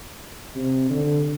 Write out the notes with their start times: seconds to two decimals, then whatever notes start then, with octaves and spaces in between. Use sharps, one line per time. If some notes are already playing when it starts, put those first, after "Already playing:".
0.55 C3
0.90 D3